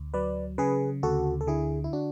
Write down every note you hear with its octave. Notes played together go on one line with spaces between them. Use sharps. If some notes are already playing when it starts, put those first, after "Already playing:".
Already playing: D2
F#3 B4 D5
C#3 G#4 B4
D2 F#4 A4
A4
D3 E4 G#4
E4
D4 F#4